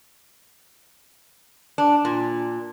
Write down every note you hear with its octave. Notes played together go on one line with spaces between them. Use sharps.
D4
A#2